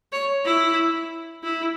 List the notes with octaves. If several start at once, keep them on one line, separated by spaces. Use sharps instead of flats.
C#5
E4
E4